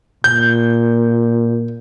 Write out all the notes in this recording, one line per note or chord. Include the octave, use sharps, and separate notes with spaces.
A#2 G6